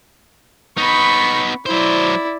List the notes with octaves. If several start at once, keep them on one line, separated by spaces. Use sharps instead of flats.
B3 D#4 B5 C#6
F#3 E4 C5 D5